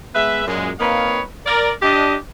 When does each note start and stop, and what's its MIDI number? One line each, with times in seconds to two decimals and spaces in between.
0.14 0.44 56
0.14 0.44 59
0.14 0.44 71
0.14 0.44 76
0.46 0.71 42
0.46 0.71 46
0.46 0.71 56
0.79 1.20 58
0.79 1.20 60
0.79 1.20 63
0.79 1.20 71
0.79 1.20 73
0.79 1.20 77
1.45 1.71 70
1.45 1.71 74
1.81 2.15 62
1.81 2.15 67
1.81 2.15 75